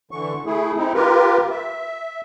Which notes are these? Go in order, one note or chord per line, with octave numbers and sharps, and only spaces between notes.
D3 E3 C#6
A3 E4 G#4
C4 D#4 E4
F4 G4 A#4 B4
E5